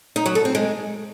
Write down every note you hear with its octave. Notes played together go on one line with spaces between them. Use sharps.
D#4
F#3
A4
C4
G#3